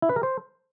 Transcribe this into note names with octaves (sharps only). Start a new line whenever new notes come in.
E4
B4
A#4
C5